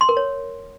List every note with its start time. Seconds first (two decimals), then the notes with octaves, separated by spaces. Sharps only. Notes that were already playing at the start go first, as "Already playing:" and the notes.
0.01 C6
0.09 A#4
0.17 C#5